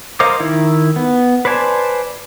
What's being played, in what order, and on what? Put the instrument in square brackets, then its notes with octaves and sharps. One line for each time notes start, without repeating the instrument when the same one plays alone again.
[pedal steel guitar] A#4 C5 D#5 F5 D6
D#3 E4
B3
B4 C5 D5 G#5 A5